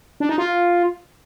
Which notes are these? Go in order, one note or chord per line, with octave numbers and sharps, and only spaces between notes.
D4
D#4
F4